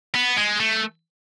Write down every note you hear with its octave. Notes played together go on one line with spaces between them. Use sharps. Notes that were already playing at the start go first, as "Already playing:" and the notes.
B3
G#3
A3